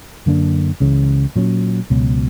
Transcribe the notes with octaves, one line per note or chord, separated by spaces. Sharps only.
F#2 D3 A#3 D4
C#2 C#3 E3
A#2 F#3 C#4
C#2 B2 F#3